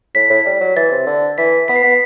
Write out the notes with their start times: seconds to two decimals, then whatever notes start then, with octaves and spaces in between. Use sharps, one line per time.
0.15 A2 B6
0.30 A2
0.46 G3
0.61 F#3
0.76 E3 A6
0.91 C3
1.06 D3
1.38 E3 B6
1.68 B3 B6
1.76 C7
1.83 B3 B6